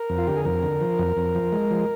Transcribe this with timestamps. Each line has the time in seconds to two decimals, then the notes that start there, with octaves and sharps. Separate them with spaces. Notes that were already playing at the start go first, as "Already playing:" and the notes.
Already playing: A#4
0.10 F2
0.18 F4
0.27 D3 G4
0.36 G#4
0.45 F2 A#4
0.63 D3
0.81 F3
0.99 F2
1.17 F2
1.35 F3
1.52 G#3
1.71 F3